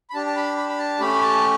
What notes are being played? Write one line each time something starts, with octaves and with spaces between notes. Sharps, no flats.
B5
D4 G4 A5
A5
B5
B5
B5
A5
A3 C#4 G4 B5
A5